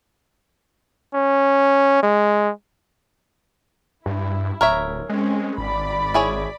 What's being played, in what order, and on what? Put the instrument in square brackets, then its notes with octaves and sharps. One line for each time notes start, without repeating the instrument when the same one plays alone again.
[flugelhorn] C#4
G#3
[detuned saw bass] G2 [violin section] E4
[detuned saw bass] D1 [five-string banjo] A#4 C#5 E5
[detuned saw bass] G#3 [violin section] C4 C#4
[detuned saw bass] G#1 [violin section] D5 B5
[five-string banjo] E4 G#4 C#5